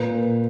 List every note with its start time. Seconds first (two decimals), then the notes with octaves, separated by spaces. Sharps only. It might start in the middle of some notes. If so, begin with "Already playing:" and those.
Already playing: A#2 A#3 B4